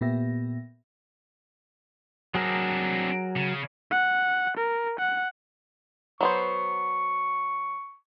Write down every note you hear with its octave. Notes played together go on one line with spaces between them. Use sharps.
A#2 B3 G4 E5 A#6
F#3 C4 D4 G#4 A#4
C#3
F#5
A#4
F#5
F#3 B3 C5 C#6